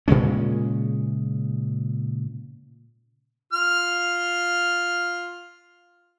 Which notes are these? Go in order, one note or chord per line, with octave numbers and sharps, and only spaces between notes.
A#2 C#3 G#3 C#4
F4 F6